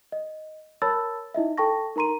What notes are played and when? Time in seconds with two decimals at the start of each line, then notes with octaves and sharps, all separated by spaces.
0.12 D#5
0.82 A#4 C#5 A5 B5 E6 A6
1.34 D#4 E4 D#5 E5
1.58 A4 G5 A5 C#6 A#6
1.96 D#4 A#4 A#5 C6 D#7